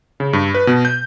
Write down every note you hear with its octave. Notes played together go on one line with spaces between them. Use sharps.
C#3
G2
B4
B2
G6